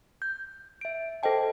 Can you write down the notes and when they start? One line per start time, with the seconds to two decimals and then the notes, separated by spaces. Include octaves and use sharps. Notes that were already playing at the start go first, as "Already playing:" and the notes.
0.22 G6
0.81 E5 D7
1.23 A4 C5 D#5 G5 A5